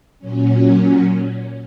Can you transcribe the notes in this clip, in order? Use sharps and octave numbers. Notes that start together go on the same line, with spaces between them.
A#2 F#3 C#4